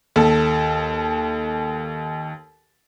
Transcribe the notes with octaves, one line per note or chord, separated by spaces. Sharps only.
D#2 A4